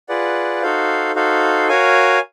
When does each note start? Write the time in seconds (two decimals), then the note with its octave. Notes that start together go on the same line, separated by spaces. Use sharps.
0.09 F4 G#4 B4 D5 F#5
0.62 D#4 F#4 A4 C5 F5
1.15 D#4 F#4 A4 C5 F5
1.69 F#4 A#4 C#5 F5 G#5